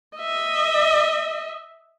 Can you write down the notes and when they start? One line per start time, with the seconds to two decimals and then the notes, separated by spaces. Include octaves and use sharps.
0.18 D#5 E5